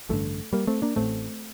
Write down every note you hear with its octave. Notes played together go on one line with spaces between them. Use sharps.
A1 G2 D3 F3 A3
G3 A#3
A3 C4
A#3 D4
A1 A2 A3 C4